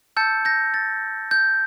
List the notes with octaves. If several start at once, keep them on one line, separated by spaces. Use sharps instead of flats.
A5 E6 G6 A6 C#7
G6 A#6
A6
G6